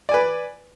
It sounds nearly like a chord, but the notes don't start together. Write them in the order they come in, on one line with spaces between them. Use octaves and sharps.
D5 G#5 B4